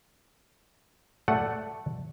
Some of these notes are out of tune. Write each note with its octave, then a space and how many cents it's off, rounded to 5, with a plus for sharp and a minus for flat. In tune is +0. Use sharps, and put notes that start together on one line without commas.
A3 +0 D5 +0 F#5 +0